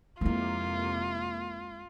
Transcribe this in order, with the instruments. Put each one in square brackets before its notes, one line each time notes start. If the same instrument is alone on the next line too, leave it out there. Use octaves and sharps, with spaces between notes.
[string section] F2 C3 A#3 [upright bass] G#3 E4 [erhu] F4